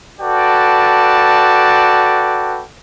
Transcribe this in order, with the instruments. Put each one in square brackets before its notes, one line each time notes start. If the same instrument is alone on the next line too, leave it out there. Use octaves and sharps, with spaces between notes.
[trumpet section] F#4 A4 B4 D5 G5 A5